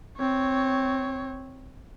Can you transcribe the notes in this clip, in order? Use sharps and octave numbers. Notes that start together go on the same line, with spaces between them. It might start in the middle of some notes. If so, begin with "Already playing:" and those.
C4 C#5